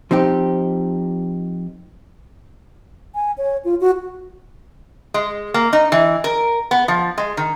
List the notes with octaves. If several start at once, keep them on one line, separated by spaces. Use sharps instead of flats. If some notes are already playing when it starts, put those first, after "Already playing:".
F3 C4 D#4 G4
G#5
C#5
F4
F#4
G#3
A#3
D#4
E3
A#4
B3
F3
G#3
D#3